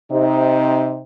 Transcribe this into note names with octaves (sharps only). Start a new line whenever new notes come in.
C3 D#4